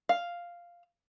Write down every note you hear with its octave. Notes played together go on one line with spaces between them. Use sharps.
F5